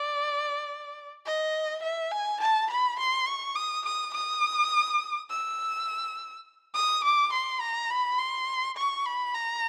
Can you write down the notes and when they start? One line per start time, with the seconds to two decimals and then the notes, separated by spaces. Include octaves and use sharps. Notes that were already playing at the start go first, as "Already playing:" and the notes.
Already playing: D5
1.26 D#5
1.83 E5
2.12 G#5
2.41 A5
2.70 B5
2.99 C6
3.28 C#6
3.56 D#6
3.85 D#6
4.14 D#6
5.30 E6
6.75 D#6
7.04 D6
7.33 C6
7.61 A#5
7.90 B5
8.18 C6
8.77 C#6
9.06 B5
9.35 A#5